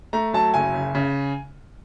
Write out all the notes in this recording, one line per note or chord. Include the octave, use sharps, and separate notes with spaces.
A3 A#5
F#3 A5
F#1 G#5
C#3
C#3